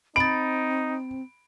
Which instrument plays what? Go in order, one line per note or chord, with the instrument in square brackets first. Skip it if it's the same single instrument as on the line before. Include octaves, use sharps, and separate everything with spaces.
[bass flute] C4 [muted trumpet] D#4 [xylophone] B5 A6 [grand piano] D7